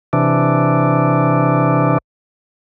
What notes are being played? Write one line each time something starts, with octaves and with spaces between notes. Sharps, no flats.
C3 E3 D4